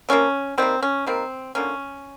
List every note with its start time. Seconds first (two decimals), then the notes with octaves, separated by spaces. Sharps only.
0.09 C3 F3 A#3 C#4
0.58 D#3 G3 A#3 C4
0.83 C#4
1.06 D#3 G3 A#3 C4
1.55 D3 F3 A#3 C#4